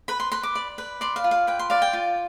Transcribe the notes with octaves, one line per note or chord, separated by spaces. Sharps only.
B4 B5
C6
B4 C6
D6
D5
B4
D5 C6
F5
F4
F5
B4 G5
C6
D5 F5
G5
F4